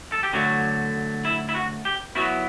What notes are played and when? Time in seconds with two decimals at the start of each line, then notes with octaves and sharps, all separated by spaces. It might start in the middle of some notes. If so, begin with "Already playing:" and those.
0.12 A4
0.23 G4
0.33 D3 F#3 A3 F#4
1.25 E4
1.49 E4
1.55 F#4
1.85 G4
2.15 F#3 B3 E4 F#4